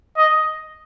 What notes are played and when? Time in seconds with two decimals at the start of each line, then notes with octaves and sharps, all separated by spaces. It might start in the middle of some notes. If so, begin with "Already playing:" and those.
0.17 D#5